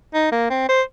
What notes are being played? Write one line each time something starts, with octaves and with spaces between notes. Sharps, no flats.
D#4
A#3
C4
C5